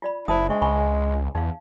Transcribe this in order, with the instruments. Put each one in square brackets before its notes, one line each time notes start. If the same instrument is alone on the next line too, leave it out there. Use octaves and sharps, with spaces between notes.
[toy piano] F4 D5 B5
[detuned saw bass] F#1 [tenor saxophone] E4 [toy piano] C5 A5 D#6
[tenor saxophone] G#3 [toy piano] D4 E5 C#6
[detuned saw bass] C#2 [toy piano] G#5 B5 C#6
[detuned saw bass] E2 [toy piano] D#4 F5